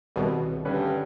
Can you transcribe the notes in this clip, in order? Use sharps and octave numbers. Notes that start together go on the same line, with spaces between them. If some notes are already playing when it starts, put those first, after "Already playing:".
C2 B2 D#3 G#4 C#5
G2 D3 C#4 B4